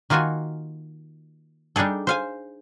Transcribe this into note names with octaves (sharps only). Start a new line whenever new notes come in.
D#3 A#3 F4 F#4 G#5
G3 D4 D#4 G#4 A4
C5 F5 G#5